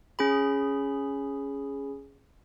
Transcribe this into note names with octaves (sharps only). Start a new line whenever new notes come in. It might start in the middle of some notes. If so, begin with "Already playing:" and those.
C#4 G#4 B5